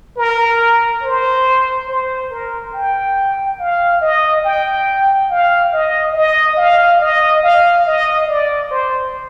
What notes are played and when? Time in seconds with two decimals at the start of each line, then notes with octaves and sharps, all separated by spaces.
0.17 A#4
1.03 C5
1.89 C5
2.30 A#4
2.73 G5
3.59 F5
4.01 D#5
4.44 G5
5.30 F5
5.72 D#5
6.15 D#5
6.57 F5
7.00 D#5
7.43 F5
7.86 D#5
8.28 D5
8.71 C5